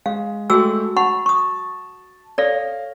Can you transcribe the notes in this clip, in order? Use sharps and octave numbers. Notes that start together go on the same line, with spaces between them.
G#3 F5
G#3 A3 F#4 G#4 G5 E6
F#5 A5 B5 C#6
C#6 D#6
A4 C#5 D5 F5 A#6